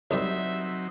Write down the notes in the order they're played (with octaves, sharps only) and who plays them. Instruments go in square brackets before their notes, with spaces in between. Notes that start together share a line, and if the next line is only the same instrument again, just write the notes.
[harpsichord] C2 G#2 G3 [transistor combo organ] F#3 C4 D#4 [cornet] E5